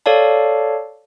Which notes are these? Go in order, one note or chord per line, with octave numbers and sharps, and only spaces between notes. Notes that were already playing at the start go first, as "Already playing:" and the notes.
A4 C#5 D5 F5 A5